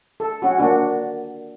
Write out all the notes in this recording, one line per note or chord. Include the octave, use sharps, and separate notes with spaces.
A4
C#4 F#4
A#3 D4 F#4